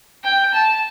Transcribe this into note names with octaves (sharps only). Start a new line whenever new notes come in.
G5
A5